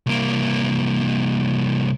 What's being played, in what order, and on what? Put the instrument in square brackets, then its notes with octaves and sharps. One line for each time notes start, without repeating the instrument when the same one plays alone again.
[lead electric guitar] C2 A#3